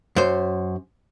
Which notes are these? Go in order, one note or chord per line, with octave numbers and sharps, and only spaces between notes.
F#2 C5